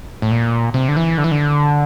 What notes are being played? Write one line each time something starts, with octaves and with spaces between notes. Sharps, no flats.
A2
A#2
C3
D3
E3
D3
E3
D3